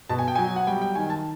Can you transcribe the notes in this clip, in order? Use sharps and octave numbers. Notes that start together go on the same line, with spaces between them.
B2 A5
G#5
G5
F#3 G#5
F#5
G3 G5
G5
D#3 G#5
A5